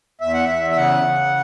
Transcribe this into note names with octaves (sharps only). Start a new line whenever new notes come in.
E2 E5
F#5
E2 E5
E5
C#3 F#5
C#3